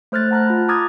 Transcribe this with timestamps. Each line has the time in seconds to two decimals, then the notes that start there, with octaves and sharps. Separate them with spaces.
0.12 A3 C5 F6 F#6 A6
0.31 F#5 A5 A#5 F6 F#6
0.47 F4 B5
0.69 A#5 D6 D#6 F6 G#6 A6